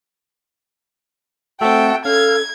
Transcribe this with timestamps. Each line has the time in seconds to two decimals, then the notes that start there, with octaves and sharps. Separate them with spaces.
1.61 A3 C4 F#4 A4 E5 G5
2.05 C#4 A4 F5 G#6